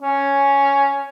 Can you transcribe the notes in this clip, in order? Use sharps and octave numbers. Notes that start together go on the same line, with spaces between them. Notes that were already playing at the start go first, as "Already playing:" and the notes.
C#4